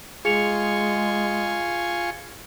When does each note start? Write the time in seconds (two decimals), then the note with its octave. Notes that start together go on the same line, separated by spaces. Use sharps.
0.25 G#3 F4 G#4 G#5 C#6 C#7 F7